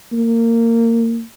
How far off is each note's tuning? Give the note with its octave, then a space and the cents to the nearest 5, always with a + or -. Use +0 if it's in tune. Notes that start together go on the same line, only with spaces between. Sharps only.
A#3 -20